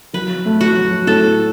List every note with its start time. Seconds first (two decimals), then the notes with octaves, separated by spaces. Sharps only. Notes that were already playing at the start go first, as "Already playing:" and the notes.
0.13 F#3 B4
0.45 A3
0.61 F#4
0.76 F#3
1.07 A2 A4